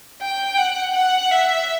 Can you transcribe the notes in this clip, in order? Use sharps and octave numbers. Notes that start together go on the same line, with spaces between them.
G5
F#5
F#5
E5